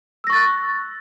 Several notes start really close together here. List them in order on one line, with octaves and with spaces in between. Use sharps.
E6 A#6 C#6 A6 F#6